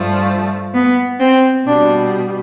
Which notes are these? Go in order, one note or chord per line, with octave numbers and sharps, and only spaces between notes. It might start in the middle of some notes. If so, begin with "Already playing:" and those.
Already playing: G2 F3 A3
B3
C4
B2 G3 D4